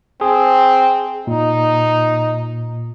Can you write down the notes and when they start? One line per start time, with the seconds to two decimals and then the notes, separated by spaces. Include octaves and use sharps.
0.21 C4 G#4
1.27 A#2 D#4